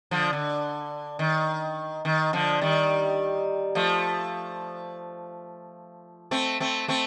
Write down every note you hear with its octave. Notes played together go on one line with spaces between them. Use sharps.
D3 F3
D3
D#3
D#3
D3 F3
D#3 G3
F3 A3
A3 C4
A3 C4
A3 C4